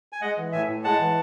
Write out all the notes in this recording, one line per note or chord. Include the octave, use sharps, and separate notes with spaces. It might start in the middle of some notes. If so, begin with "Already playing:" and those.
G#5
G#3 D#5 F#5
E3
A2 E5 G#5
A2
G#3 F#5 A5
E3